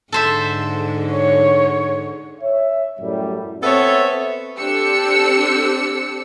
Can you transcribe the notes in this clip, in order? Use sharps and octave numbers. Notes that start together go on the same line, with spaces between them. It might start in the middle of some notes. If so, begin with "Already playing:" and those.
G#2 D3 A4 C5 E5
C#5
C#5 E5
F#2 A2 G3
B3 C4 A4 C#5 E5
C4 D4 G4 A4 E6 C#7